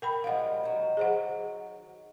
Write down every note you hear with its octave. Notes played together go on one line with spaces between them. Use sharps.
A#4 G5 B5
F3 G3 G#3 F5 F#5
D#3 F#3
G#4 C5 F#5